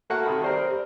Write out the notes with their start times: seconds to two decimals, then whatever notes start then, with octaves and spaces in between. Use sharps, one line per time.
0.10 A3 A#3 F#4 F#5
0.26 C3 D#3 B5
0.44 G3 C4 A#4 C5
0.67 G3